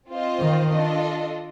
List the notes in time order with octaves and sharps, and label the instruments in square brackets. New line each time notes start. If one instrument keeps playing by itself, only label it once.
[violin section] C4 F4 C5 D#5
[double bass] D#3
[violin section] D4 F4 A4 D#5